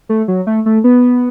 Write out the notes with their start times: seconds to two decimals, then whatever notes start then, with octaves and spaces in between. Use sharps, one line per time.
0.09 A3
0.28 F#3
0.47 A3
0.66 A3
0.84 B3